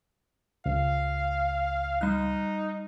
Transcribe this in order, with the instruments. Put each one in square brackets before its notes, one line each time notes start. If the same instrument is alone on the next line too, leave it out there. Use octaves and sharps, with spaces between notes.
[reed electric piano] C#2 [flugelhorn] F5
[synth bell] G3 F#6 [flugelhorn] D#4